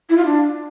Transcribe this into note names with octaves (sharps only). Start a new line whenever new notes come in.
E4
F4
D4